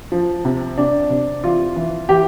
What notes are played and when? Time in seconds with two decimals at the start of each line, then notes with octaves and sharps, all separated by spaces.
0.12 F3
0.45 C3
0.78 C3 D4
1.10 C3
1.44 E3 F4
1.76 E3
2.09 E3 G4